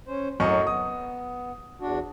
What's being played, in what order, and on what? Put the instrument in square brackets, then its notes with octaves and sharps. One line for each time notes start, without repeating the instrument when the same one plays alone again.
[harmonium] C#4 C5
[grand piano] F#2 D#5 C#6 [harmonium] A2 F#3 F#4
[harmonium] B3 [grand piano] D#6
[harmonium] E2 D4 F#4